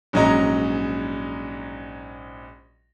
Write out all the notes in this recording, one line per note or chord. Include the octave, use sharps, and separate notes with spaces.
A#1 G#2 F#3 C#4 D#5 A#5